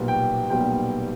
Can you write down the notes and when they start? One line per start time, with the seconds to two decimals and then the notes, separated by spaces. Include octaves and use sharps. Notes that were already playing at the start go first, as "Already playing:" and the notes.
Already playing: B1 A#2 G3 B3
0.08 G5
0.49 B1 A#2 G3 B3 G5